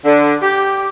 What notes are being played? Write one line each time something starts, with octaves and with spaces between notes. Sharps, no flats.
D3
G4